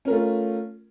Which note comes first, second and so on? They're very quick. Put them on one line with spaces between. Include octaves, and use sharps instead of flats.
C#4 A#4 A3 F4